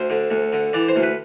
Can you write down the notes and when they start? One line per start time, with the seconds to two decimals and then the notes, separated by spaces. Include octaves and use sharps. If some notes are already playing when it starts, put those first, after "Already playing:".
Already playing: D2 C5
0.10 D3
0.31 D2
0.52 D3
0.73 E3 D5
0.88 C5
0.96 D2
1.03 B4